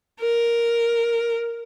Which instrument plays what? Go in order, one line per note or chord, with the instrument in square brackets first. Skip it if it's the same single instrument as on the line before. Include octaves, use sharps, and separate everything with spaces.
[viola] A#4